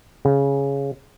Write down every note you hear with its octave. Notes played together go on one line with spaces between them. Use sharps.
C#3